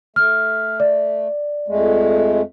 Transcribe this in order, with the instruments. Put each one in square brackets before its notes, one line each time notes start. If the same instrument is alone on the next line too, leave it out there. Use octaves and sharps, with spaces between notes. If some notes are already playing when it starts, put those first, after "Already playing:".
[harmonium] A3 [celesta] F6
[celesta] D5
[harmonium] F2 G#3 A3